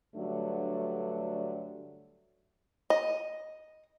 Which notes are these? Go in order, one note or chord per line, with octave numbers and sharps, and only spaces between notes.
G2 D3 F#3 A3 D4
D#5